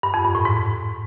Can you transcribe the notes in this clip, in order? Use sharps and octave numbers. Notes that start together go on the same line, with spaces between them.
G2
F2
G2
A2
G#2